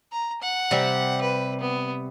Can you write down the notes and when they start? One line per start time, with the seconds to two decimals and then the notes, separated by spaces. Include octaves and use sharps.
0.12 A#5
0.42 F#5
0.71 C3 G3 C4
1.22 B4
1.61 B3